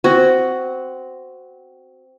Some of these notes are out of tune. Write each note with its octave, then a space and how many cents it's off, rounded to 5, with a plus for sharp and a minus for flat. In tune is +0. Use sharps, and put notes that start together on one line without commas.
C4 -10 F#4 +5